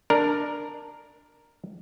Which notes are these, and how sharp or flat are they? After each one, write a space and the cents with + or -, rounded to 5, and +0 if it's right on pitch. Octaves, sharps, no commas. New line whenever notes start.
D4 +10 A#4 +0